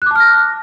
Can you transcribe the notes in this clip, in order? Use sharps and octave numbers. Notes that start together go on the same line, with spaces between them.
A5 D6 F6 F#6 A#6